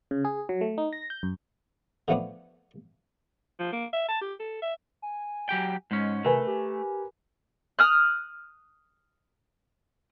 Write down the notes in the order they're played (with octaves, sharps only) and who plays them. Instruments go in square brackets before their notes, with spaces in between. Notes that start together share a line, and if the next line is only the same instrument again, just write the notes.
[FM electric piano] C#3
G#4
F#3
A3
D#4
A#6
G6
F#2
[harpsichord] D3 F3 A3 B3 C#4 D4
[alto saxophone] F3
A#3
E5
A5
G4
A4
E5
[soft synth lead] G#5
[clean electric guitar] F#3 G4 G5
[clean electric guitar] G#2 C#4 [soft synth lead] G#3
[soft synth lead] C3 [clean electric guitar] A3 [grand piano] A#4 B4 G#5
[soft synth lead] G4
[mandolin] D#6 F6 F#6